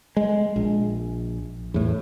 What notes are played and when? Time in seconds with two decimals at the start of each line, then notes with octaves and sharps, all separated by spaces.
0.17 G#3
0.56 A#1
1.74 E2 A2